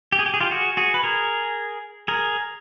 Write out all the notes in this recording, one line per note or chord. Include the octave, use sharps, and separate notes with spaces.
G4
G#4
G4
G#4
F4 G4
F#4 G#4
F#4 G#4
B4
G#4 A#4
G#4 A#4